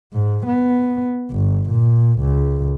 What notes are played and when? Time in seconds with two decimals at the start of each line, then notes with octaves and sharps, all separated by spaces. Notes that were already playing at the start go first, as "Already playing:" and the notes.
0.13 G#2
0.46 B3
1.31 G1
1.70 A#2
2.20 C#2